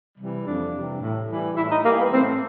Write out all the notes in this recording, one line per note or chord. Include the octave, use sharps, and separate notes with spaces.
C3 E3 G3
F2 D4
C3 E3 G3
A2
E3 G3
A2 E4
D#4
E3 G3 A#3
B3
A2 C4